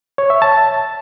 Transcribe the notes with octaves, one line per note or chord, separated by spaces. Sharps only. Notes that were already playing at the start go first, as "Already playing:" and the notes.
C#5
E5
A5